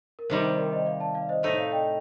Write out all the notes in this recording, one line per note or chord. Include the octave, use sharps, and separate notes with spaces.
A#4
C3 D#3 G3 C5
C5
A#4 D5
C5 D#5
D5 F5
F5 A5
D5 F5
C5 D#5
A2 A3 D#4 C5 D#5
D5 F5
D#5 G5